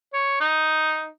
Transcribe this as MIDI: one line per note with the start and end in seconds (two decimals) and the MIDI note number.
0.13 0.40 73
0.40 1.09 63